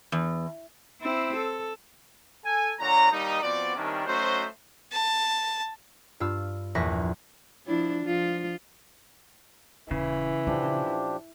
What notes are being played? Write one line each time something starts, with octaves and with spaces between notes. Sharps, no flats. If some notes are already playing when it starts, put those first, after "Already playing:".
E2
C4 E4
A4
A4 G#5
A#2 D3 C#5 F#5 A#5
D#2 G3 A#3 D4 D#4
F3 B3 C4 F#4 D5
C3 D#3 G3 A#3 C#4 D4
F#3 A3 C#4 D#4 F#4 C5
A5
G2 F4 E6
A#1 E2 C#6 A#6 B6
F3 D4 E4
F3 F4
D#1 C#3 E3 E4
A#2 F3 C#4 D4 G4